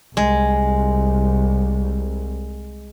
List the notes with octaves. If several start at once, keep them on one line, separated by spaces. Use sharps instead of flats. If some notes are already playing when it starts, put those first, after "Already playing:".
C2 G#3